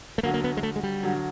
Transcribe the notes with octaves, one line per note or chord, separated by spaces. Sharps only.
A3
D2 D3 F#3 A#3
A#3
B3
G#3
A3
G#3
G3
D2 D3 F#3